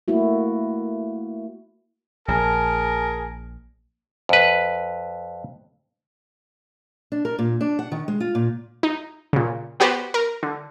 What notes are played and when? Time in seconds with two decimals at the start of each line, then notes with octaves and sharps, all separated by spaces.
0.08 A3 A#3 E4 F#4
2.28 A#1 G#4 A#4 A5
4.29 F2 B4
7.12 D4
7.25 A#4
7.39 A#2
7.61 D4
7.79 F#5
7.92 D#3
8.08 G#3
8.20 F4
8.35 A#2
8.83 D#4
9.33 A#2 C#3
9.80 B3 F#4 G4 B4 C5
10.14 A#4
10.43 D3